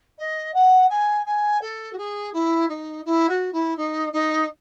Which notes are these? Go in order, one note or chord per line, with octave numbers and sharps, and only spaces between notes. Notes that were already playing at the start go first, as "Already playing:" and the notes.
D#5
F#5
G#5
G#5
A4
F#4
G#4
E4
D#4
E4
F#4
E4
D#4
D#4